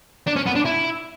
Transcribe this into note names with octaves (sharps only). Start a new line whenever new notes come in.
D4
C#4
B3
D4
E4